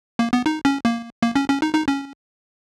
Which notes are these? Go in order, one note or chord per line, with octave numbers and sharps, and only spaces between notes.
A#3
B3
D#4
C#4
A#3
A#3
C#4
C#4
D#4
D#4
C#4